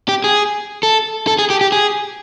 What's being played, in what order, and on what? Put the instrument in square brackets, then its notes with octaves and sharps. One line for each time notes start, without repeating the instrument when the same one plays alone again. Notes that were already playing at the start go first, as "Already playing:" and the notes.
[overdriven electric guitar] G4
G#4
A4
A4
G#4
G4
G4
G#4